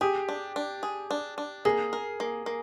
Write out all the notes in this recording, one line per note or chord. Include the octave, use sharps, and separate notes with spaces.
G4 G#4
D4
D4
G#4
D4
D4
A#3 G#4
A#4
A#3
A#3